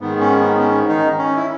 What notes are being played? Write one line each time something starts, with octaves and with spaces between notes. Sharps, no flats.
G#2 D#3 B3
C#4
B3
C#4
D#3 D#4
C#4
E4